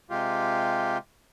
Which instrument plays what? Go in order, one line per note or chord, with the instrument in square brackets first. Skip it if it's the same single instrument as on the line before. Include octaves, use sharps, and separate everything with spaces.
[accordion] C3 G#3 F4 G4